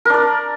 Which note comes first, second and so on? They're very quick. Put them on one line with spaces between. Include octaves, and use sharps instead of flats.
A#4 D4 D5